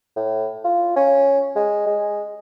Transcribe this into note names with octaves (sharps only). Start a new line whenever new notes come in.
A2
F4
C#4
G#3
G#3